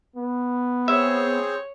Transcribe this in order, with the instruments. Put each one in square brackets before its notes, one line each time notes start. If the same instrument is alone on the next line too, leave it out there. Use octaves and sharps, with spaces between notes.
[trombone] B3
[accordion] C4 G#4 C5 [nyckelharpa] C#5 [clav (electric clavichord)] E5